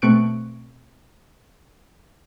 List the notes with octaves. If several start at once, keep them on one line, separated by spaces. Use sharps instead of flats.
B2 A3 C4 C#6 F#6 D7